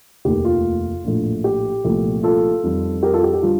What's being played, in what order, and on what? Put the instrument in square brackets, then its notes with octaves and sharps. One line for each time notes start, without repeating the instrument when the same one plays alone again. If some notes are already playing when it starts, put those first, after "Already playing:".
[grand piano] F1 D#2 D#3 A3 G4
F4
A#1 A2 F3 A3
G4
C2 A#2 F3 A3
F4 A4
F2 D#3 G3
G4 A#4
F4 A4
G4
G4
D3 G3 F4